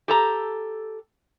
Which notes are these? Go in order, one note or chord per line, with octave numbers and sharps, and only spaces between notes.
G4 A4 A#5